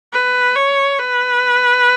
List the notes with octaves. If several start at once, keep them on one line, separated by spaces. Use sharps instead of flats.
B4
C#5
B4